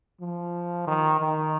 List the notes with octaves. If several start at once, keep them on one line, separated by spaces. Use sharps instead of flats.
F3
D#3
D#3